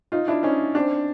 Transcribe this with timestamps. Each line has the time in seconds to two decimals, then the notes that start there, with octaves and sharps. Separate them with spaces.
0.12 D#4 F4
0.28 D4 E4
0.43 C#4 D#4
0.75 C4 D4